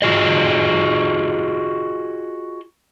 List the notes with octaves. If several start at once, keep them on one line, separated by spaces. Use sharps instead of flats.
F4 F#4 G#4 D#5